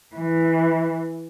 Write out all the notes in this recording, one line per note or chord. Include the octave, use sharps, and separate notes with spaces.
E3